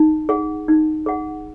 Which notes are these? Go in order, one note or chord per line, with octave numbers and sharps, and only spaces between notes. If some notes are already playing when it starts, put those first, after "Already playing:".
Already playing: D#4
G#4 F#5
D#4
G#4 F#5